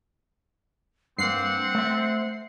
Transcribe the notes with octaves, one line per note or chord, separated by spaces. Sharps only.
G2 A#3 C4 F#5 C7
A3 C5 E5